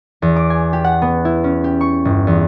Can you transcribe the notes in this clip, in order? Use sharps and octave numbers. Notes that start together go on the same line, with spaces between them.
E2
D6
G#5
G4
F#5
B3
E4
C#4
G4
C#6
G1
E2